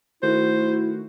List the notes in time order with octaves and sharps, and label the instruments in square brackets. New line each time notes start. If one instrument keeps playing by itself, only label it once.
[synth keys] D#3 A3 F#4 [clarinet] E4 [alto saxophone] C5